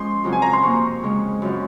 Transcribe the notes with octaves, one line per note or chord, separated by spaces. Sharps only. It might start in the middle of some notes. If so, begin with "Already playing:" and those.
Already playing: F3 G#3 C#4 C6
F2 C#3 F#3 C4 F4
G#5
A#5
C6
C3 F3 A#3 C#6
C#3 F3 G#3
F#2 C#3 F3